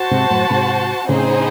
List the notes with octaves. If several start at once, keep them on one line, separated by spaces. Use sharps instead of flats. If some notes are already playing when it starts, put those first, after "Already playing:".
Already playing: F#4 C5 F#5 A5
G#2 C3
F#2 A2
G#2 C3
A2 C#3 C4 D#4 G#4 C5